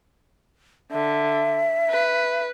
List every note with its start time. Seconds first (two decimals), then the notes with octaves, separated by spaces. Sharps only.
0.91 D3 E5
1.90 B4